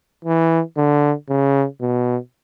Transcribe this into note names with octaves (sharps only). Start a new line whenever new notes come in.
E3
D3
C#3
B2